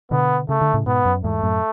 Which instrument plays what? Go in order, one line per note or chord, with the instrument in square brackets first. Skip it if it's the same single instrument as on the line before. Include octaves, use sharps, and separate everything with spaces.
[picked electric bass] B2 D3 [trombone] B3
[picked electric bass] C#3 [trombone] A3
[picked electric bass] D3
A2 C#3
[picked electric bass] G#2 B2 [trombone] B3
[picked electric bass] F#2
[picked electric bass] E2 G#2 [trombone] A3
[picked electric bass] F#2 A2